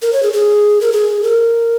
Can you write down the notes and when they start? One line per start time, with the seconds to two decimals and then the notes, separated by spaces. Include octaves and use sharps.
0.02 A#4
0.13 C#5
0.23 G#4
0.33 G#4
0.81 A#4
0.92 G#4
1.23 A#4